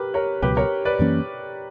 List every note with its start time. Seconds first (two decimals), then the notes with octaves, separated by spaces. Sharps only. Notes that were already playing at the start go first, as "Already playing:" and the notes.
Already playing: G4 A#4 B4
0.14 A#4 C#5
0.42 C#2 B2 F#3 G4 B4
0.57 A#4 C#5
0.85 B4 D5
0.99 F#2 E3 A#3 C#4